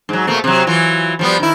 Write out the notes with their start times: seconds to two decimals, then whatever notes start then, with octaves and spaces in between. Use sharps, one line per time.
0.09 G#2 F#3
0.27 B2 A3 A#3
0.44 C3 F#3
0.67 E3 F#3 F4
1.19 F3 G3 B3
1.40 D#3 E4